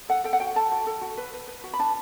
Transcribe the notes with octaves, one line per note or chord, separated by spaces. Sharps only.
A4 F#5
A4 G5
F#5
F#4 G5
A4 A5
F#4
A4
F#4
B4
B4
B4
F#4
B5
D4 A5